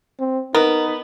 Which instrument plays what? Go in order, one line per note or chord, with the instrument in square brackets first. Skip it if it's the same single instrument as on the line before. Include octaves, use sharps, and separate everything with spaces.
[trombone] C4
[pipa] B3 [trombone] D#4 [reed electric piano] A#4